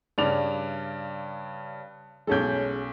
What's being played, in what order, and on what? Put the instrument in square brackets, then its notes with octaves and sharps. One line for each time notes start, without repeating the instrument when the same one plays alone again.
[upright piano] G2 C#3 [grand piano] D5 D6 F7
[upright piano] B1 A4 [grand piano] G#3 C#4 G6